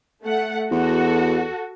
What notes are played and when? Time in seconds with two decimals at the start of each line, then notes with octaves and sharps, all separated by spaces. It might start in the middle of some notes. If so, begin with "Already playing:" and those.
0.24 A3 F#5
0.71 E2 F#4 A4